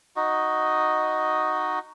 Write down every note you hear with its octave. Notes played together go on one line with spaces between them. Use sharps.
D#4 F#4 D#5